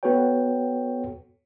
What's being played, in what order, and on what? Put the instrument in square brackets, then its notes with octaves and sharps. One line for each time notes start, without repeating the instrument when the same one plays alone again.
[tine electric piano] B3 F#4 A4 B4 C#5 G5